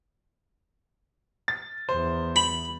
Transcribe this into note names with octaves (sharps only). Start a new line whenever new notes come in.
A6
E2 C5
B5